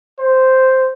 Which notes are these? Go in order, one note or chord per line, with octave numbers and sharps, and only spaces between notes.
C5